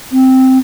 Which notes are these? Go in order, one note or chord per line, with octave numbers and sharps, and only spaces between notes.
C4